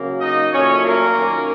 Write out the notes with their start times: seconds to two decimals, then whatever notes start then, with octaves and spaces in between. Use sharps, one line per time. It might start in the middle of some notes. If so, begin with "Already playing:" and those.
Already playing: C#3 F#3 A#3
0.20 D#4 D#5
0.52 A#2 F#3 A3 C#4 C#5
0.84 A#3 A#4
1.16 F#2 D#3 A#3 C#4